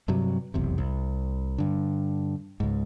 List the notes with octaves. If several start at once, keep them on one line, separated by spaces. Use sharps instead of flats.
G2 C3 F#3
F1 B1 E2 C3
C2
G2 D3
C#2 G#2